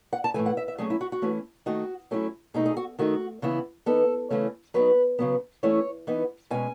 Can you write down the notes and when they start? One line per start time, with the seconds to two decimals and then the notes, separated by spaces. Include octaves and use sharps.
0.13 F#5
0.24 A5
0.34 A2 E3 A3 G#5
0.46 F#5
0.57 E5
0.68 E5
0.78 F#3 A3 C#4 G#4
0.90 E4
1.01 F#4
1.12 F#4
1.22 E3 A3 C#4 E4
1.66 D#3 A3 D#4 F#4
2.11 F#3 A3 C#4 E4
2.54 B2 A3 D#4 G#4
2.66 G#4
2.77 F#4
2.99 D#3 A3 D#4 F#4
3.42 C#3 E3 B3 E4
3.86 E3 B3 D#4 A4
4.30 C#3 E3 A3 C#4
4.74 F#3 B3 D#4 B4
5.19 C#3 F#3 B3
5.63 E3 A3 C#4 E4 C#5
6.07 E3 B3 D#4
6.50 B2 G#3 C#4 G#5